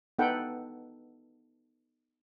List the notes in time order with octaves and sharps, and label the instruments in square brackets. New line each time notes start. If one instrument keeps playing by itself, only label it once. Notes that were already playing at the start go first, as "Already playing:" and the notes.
[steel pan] B3 D#4 A4 B4 F#5 G5